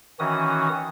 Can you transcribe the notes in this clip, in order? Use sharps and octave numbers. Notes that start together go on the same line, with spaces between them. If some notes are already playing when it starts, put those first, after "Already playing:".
D#3 E3 C#4 F#4 D#6